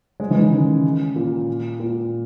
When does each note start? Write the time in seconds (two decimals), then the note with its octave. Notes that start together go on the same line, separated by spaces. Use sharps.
0.20 G#3
0.31 E3
0.42 D#3
0.52 C#3
1.16 A#2
1.80 A#2